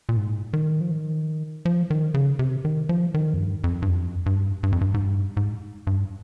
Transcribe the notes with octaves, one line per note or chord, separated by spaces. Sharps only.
A#2
G#2
D#3
F3
D#3
F3
D#3
C#3
C3
D#3
F3
D#3
F2
G2
F2
G2
F2
G2
G2
F2
G2
G#2
G2
G#2
G2